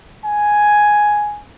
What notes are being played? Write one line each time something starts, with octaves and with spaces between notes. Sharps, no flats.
G#5